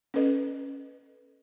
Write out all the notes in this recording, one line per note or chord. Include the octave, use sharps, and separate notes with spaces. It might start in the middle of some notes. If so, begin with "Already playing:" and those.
C#4 A4 B4 D#5